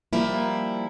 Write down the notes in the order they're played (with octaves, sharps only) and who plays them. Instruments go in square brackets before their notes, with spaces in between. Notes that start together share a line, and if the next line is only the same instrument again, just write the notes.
[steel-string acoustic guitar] F3 G3 A#3 E4